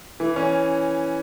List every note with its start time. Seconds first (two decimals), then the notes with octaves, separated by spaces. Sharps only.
0.20 E3
0.36 C#4